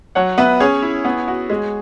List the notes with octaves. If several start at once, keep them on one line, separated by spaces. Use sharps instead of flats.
F#3 C#5 F#5
B3 B4 E5
C#4 G#4 C#5
E4
B3
F#4
G#3